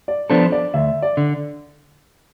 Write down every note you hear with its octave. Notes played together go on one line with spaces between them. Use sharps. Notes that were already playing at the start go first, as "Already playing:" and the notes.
D5
F3 B3 D4 A4 C5
D5
D2 E5
D5
D3